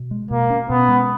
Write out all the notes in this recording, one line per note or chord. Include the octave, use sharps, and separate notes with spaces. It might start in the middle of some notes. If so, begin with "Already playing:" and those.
Already playing: B2
G#3
B2 A#3
C#4
B2 B3
G#3